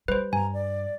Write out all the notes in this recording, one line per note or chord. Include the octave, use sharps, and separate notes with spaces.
G3 B4 C5
G2 G#5 A#5
D5